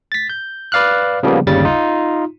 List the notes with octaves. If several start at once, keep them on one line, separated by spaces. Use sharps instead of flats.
A6 B6
G6
B4 D5 F5 F6 F#6
C#3 F3 G3 A#3 B3
G1 D#2 C#3 G3 A6
D#4 F4